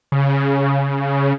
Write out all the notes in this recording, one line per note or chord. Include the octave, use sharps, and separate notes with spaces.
C#3